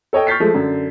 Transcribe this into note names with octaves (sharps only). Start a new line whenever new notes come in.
A4 C#5 D#5 G5
C#6 F6 G6 A6 B6 C7
F3 G#3 A3
F#2 D3